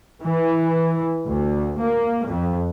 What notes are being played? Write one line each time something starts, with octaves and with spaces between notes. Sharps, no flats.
E3
D2
A#3
F2